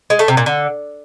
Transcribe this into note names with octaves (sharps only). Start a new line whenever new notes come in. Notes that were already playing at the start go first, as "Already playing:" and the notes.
G#3
A3
C3
A#2
D3